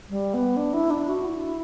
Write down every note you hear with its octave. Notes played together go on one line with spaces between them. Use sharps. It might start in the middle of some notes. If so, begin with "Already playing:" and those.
G3
B3
D4
E4
D4
F#4
E4